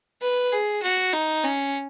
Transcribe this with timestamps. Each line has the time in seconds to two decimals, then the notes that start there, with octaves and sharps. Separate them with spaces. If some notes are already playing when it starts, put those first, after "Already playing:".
0.22 B4
0.52 G#4
0.83 F#4
1.13 D#4
1.44 C#4